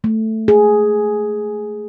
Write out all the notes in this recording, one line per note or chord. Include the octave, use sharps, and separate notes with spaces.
A3
G#4